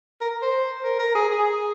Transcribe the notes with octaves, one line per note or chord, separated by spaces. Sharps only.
A#4
C5
A#4
A#4
G#4
G#4